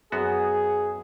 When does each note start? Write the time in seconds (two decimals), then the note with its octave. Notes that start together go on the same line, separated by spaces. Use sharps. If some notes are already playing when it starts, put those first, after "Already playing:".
0.12 F#2 B3 F#4 G#4